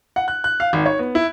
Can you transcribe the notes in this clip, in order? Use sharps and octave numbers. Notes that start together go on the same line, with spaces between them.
F#5
F#6
F#6
F5
G#1
C#5
B3
E4